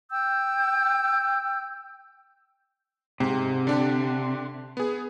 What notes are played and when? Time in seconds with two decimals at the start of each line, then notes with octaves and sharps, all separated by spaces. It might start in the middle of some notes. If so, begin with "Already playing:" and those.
0.10 G5 E6 G6
3.20 G#2 C3
3.67 D3 D4 G4
4.77 B3 G#4